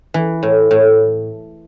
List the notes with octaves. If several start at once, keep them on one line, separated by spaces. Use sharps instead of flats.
E3
A2
A2